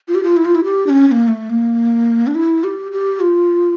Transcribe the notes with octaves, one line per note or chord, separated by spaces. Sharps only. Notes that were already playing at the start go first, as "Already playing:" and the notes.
F4
G4
F4
E4
F4
E4
G4
D4
C#4
C#4
A#3
A3
A#3
D4
E4
G4
G4
F4